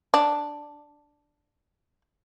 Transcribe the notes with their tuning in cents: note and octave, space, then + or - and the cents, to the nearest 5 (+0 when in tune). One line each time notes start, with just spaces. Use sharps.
D4 +0